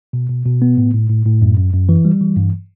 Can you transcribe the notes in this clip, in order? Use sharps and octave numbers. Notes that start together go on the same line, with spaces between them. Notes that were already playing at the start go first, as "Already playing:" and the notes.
B2
B2
B2
B3
A2
A2
A2
A2
F#2
F#2
F#2
E3
G3
E3
G2